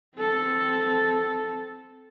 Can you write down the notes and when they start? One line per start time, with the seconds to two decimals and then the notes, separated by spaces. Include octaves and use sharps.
0.18 C4 A4